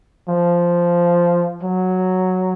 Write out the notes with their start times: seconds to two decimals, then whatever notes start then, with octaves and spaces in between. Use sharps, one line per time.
0.28 F3
1.63 F#3